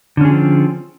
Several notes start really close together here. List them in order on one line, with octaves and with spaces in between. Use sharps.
D3 C#4 G#4 F3 C4